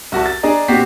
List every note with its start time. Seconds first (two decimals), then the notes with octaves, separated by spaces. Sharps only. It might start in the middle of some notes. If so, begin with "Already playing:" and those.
0.12 C2 F#4 A5
0.26 A6
0.43 D4 G#4 D5 D#5 A#5
0.68 A#2 C4 F#4 G4 B6 C7